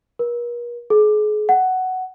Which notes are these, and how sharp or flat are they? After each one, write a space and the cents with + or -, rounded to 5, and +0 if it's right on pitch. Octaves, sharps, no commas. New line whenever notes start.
A#4 +45
G#4 +35
F#5 +10